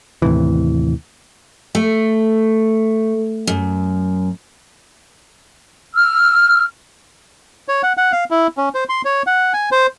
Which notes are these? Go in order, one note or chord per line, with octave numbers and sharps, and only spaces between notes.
D#2 A2 C3 E3
A3
F#2
E6 F6
C#5
F#5
F#5
F5
E4
C#4
C5
C6
C#5
F#5
G#5
C5